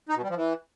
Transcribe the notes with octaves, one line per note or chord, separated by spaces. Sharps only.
D#4
B2
G3
F3
E3